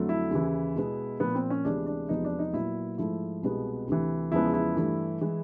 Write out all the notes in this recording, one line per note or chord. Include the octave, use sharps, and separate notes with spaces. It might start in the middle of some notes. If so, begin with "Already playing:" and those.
Already playing: F2 D3 F#3 A3
E4
D#2 C#3 E3
B2 G#3 B3
A#2 F3 A#3 B3
C4
C#4
D2 C3 E3 G#3 B3 D4
D4
E2 C3 F3 G#3 B3 D#4
D4
D#4
A#2 F#3 B3 E4
G#2 F3 A3 E4
C2 B2 G#3 B3
D2 C3 E3
E2 C#3 F3 G#3 B3 E4
E4
G2 E3 A3
E3 G#3